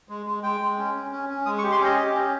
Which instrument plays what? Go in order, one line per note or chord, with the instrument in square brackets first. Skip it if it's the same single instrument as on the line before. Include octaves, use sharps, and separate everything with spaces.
[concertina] G#3
G#3
G#3 G5
G#3
C#4
C#4
C#4
C#4
G#3 D#6
C#6
G4
C6
C#4 D#5
G4
C#4